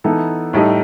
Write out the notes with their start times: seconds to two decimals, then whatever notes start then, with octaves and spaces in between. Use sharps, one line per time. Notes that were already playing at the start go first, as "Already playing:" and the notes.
0.04 E3 B3 D#4 A4
0.53 A2 G3 D#4 A4 D#5